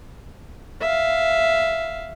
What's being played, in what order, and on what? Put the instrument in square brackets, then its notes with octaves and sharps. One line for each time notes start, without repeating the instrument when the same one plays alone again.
[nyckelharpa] E5 F5